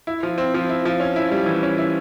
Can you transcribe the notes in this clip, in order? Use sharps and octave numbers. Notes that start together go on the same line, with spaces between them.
E4
F3
C4
F3
E4
F3
C#4
E4
G3
E3
C#4
E4